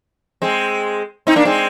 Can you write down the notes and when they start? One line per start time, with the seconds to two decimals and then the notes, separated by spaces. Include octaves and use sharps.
0.42 G#3 C4
1.27 C4 D#4
1.36 A#3 D4
1.45 G#3 C4